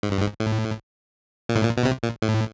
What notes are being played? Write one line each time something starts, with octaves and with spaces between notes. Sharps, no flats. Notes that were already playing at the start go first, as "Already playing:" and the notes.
G#2
G2
G#2
A2
A#2
A2
A#2
B2
C3
A#2
A2